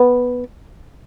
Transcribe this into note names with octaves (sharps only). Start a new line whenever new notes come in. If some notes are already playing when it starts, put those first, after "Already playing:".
Already playing: B3